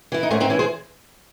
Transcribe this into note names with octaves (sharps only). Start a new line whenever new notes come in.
E3 E4
D#4
G#2 A3 C#4
C4 D#4
E3 C#4 E4
G#4 C5